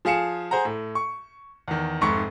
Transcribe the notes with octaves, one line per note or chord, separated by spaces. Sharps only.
F3 G#4 F5 C#7 E7
G#4 C5 F#5 A#5
A2
C#6
E2 D#3
F1 G#2 C#6